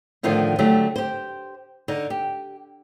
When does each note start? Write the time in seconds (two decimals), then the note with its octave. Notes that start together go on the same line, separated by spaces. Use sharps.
0.23 A2 D3 D#3 F3 F4
0.59 D3 F#3 A3 G4
0.96 G4 C5
1.88 D3 D#4
2.10 G4